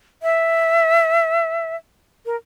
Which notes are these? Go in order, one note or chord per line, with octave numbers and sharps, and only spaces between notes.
E5
A#4